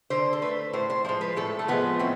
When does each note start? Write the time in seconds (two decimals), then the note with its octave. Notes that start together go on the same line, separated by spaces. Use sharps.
0.10 D3 C5
0.33 A4
0.42 A3 B4
0.73 A2 C5
0.90 C5
1.05 F3 G#3 C5
1.21 B4
1.37 A2 A4
1.59 A3
1.68 F3 G#3 B3
1.99 A2 C4